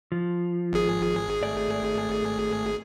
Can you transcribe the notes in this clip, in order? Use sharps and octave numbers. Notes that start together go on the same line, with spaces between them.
F3
G#1 G#4
A3 D5